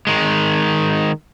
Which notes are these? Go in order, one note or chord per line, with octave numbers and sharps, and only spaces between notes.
D#3 G#3